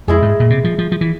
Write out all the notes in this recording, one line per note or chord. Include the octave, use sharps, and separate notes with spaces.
F2 G#3 E4 G#4
G#2
A#2
C3
F3
F3
F3
E3